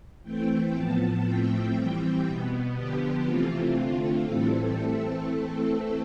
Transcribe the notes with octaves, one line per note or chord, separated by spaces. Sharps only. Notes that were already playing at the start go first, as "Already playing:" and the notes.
E3 A3 C4 G5
A2 F3 B3 A5
A2 F3 A3 C4 G5
E3 G3 C4
B2 B3
D3 F3 B3 G4
C3 E3 A3 C4 F4
D3 A3 C4
A2 E3 G3 C4 A4
E3 A3 C4
E3 A3 C4 A4